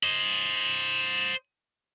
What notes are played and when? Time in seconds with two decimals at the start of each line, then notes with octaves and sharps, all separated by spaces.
0.03 C5 D#5